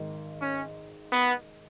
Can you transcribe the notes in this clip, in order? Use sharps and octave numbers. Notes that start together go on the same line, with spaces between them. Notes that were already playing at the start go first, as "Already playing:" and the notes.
Already playing: G#1 G#2 D#3
C#4
B3